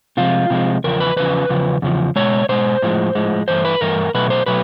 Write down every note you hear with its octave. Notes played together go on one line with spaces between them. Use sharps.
C3 F3 G#3 F4
C3 F3 G#3
E2 C#3 F3 A#4
B4
E2 C#3 F3 B4
E2 C#3 F3
E2 C#3 F3
B2 G#3 C#5
B2 G#3 C5
A2 F3 G#3
A2 F3 G#3
G2 E3 A3 C5
B4
G2 E3 A3 A#4
B2 F#3 A3 B4
C5
B2 F#3 A3 B4